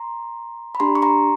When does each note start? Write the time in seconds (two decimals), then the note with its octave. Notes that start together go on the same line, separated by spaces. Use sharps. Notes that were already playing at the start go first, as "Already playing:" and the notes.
Already playing: A#5 C6
0.75 B5
0.80 D4 G4 A#5 C6
0.95 C#6
1.02 A#5 C6